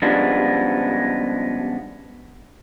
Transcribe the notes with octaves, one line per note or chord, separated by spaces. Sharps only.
C#3 F3 G3 G#3 B3 D4